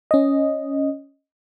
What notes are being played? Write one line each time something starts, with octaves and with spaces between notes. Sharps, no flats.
C#4 D#5